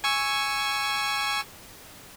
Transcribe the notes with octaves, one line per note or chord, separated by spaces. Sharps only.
G#5 C#6 E6